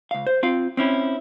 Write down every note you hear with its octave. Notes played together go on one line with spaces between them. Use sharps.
C#2 F5
C5
C4 F4 F5
C4 C#4 E4